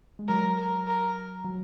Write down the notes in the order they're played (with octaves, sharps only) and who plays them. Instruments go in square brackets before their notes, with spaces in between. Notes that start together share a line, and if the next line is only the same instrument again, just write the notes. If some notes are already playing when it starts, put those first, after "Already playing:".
[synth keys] G#3
[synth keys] F#3 [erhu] A#4
[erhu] A#4
A#4
[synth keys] F#3